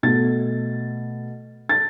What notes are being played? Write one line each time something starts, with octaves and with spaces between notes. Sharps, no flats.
B2 A3 A6
A6